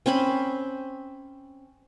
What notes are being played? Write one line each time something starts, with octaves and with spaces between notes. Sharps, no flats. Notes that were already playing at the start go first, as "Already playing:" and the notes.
C4 C#4 C5 B5